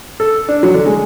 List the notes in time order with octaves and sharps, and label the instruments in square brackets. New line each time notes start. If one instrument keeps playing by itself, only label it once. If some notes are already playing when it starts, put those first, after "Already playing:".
[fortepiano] A4
D4
F#3
D3
G#3